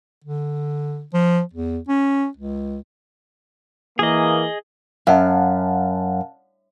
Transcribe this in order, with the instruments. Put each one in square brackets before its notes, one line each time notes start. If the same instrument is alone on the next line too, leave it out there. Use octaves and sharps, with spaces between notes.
[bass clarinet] D3
F3
E2
C#4
C#2
[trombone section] E3 A#3 [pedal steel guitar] G#4 D#5
[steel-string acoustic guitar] F#2 [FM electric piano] F5 F#5 A5